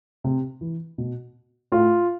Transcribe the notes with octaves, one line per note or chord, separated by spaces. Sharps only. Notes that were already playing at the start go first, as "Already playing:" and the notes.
C3
E3
B2
A2 F4